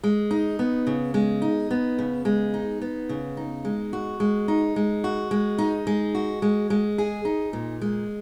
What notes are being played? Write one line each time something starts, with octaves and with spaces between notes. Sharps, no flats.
G#3
D#4
B3
C#3
G#3
D#4
B3
C#3
G#3
D#4
B3
C#3
D#4
G#3
F#4
G#3
D#4
G#3
F#4
G#3
D#4
G#3
F#4
G#3
G#3
G#4
D#4
A#2
G#3